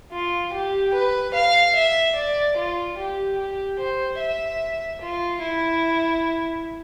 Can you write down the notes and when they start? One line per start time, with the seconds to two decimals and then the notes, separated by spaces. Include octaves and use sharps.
0.12 F4
0.53 G4
0.94 B4
1.34 F5
1.75 E5
2.15 D5
2.57 F4
2.98 G4
3.38 G4
3.79 C5
4.19 E5
5.01 F4
5.42 E4